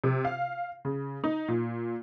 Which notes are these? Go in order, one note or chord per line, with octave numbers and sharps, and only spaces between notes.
C3
F5
C#3
D#4
A#2